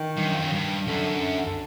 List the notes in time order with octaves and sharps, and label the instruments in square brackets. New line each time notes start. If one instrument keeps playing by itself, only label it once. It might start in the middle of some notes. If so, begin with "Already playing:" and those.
Already playing: [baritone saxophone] D#3
[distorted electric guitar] G2
F#2
F2
F#2
G2
[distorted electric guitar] F#2 [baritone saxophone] D3
[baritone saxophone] D3